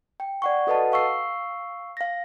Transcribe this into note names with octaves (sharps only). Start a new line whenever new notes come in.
G5
D5 F#5 C#6
F#4 A4 B4 D#5 F#5 A5
F5 C#6 E6 C7
F5 A#6